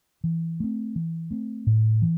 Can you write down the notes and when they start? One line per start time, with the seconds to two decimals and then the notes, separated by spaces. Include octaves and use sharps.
0.24 E3
0.60 A3 C4
0.96 E3
1.31 A3 C4
1.67 A2
2.02 E3